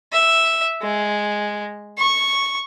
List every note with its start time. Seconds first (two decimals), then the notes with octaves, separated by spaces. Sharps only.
0.13 E5
0.82 G#3
1.98 C#6